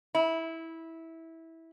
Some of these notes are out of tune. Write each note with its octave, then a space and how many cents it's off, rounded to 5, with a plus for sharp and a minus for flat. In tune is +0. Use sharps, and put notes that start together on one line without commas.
E4 -15